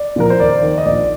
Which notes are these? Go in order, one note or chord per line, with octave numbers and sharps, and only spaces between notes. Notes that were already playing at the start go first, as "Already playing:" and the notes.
Already playing: D5
A#2 F3 A#4
C5
D#2 D5
D#3
D#5
A#1 D5